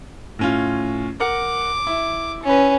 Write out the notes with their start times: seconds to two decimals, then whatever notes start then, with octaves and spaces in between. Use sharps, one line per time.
0.39 A2 C#4 F4
1.20 A#4 F#5 D6 C#7
1.87 E4
2.43 C#4 B4